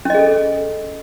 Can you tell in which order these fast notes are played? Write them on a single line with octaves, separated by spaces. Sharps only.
C#4 D#5 G#4 A4